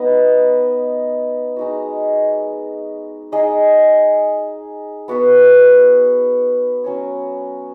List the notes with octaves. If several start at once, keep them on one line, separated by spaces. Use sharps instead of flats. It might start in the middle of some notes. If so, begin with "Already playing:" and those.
Already playing: B3 D#4 B4 D#5
G#3 D#4 F#4
D#4 G#4 D#5
B3 F#4 B4
F#3 C#4 F#4 C#5